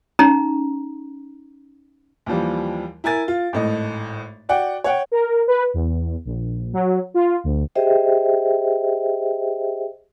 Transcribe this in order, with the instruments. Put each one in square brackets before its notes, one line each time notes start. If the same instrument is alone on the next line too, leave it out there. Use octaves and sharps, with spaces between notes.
[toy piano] C#4 D#4 A#5
[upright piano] D#2 E3 F3 G3
E4 A#4 G#5 A6
F4
G#1 A2 D#5
F#4 D5 F#5 G5
C#5 F#5 G5
[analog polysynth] A#4
B4
E2
A#1
F#3
F4
D2
[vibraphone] G4 G#4 C5 D#5 E5 G5